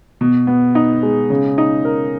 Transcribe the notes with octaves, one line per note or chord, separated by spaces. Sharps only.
B2
B3
D#4
G#3
C#3
D#4
A#4